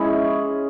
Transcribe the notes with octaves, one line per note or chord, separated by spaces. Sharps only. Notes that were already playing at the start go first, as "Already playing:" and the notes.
Already playing: G#3 C#4 E4 G#4